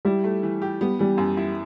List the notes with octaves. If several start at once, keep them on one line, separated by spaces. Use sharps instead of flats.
G3 E4
A3
E3
G4
G3 B3
E3 G3
F#2
E4